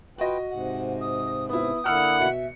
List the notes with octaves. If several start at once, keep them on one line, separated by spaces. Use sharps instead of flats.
F4 F#4 B4 D#5 G5
G#2 C3 F#5
D#6
B3 E4 D#6
D3 A#3 E4 F#5 E6 F6 C#7
B2 E5 C#7